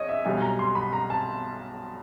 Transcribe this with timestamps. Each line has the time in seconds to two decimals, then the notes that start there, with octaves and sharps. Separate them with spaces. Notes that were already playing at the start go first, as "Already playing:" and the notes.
Already playing: A#1 C#5 D#5
0.09 E5
0.25 B1 B2 G3 G#5
0.42 A#5
0.59 C6
0.75 B5
0.93 A#5
1.10 A5